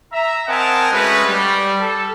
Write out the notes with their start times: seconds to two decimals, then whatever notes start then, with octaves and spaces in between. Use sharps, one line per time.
0.13 E5 A#5
0.48 C4 A#4 D#5 F#5 G#5 A5
0.92 G#3 A3 C#4 F#4 B4
1.27 G3
1.79 A4